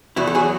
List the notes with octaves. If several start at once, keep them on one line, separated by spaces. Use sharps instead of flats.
E2 E4 F#4
A4
F#3 F#4 G#4